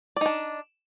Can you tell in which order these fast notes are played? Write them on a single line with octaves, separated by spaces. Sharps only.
D5 D#4 D4